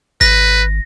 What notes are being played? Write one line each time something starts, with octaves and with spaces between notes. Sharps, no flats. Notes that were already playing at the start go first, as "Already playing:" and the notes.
G#1 B4 A#6